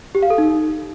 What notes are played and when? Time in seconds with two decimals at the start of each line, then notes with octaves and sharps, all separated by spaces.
0.15 G4
0.23 F5
0.30 A4
0.38 D#4